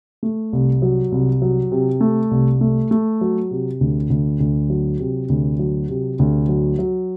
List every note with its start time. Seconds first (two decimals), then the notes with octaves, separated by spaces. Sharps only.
0.23 A3
0.53 C2
0.82 F#3
1.12 C2
1.42 F#3
1.72 C3
2.01 A3
2.31 C2
2.61 A3
2.91 A3
3.21 F#3
3.51 C3
3.81 D2
4.10 D2
4.40 D2
4.70 F#3
5.00 C3
5.29 D2
5.59 F#3
5.89 C3
6.19 D2
6.49 F#3
6.79 F#3